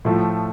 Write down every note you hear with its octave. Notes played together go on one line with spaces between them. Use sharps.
A2 F3 A3